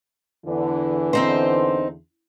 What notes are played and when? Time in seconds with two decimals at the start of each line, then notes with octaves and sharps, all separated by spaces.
0.46 E2 D3 E3
1.13 C4 D#4 C5